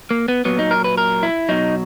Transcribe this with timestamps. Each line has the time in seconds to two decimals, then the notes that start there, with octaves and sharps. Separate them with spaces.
0.11 A#3
0.28 B3
0.45 A#2 F#3 B3
0.59 D#4
0.71 A#4
0.84 B4
0.98 A#4
1.23 E4
1.49 B2 F#3 D#4